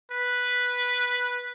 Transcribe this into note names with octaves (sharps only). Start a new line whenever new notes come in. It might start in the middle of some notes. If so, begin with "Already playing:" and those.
B4